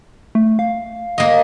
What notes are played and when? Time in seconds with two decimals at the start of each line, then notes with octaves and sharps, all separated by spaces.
0.35 A3
0.59 F5
1.18 A#3 D#5